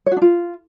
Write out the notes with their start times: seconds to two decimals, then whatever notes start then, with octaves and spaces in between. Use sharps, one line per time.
0.06 C#5
0.11 F#4
0.17 D4
0.22 F4